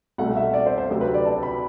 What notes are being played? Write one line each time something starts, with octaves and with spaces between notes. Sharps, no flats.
C2 B2 A3 F#5
E5
D5
C5
C5
D2 C3 F#3 A3
B4
D5
A5
B5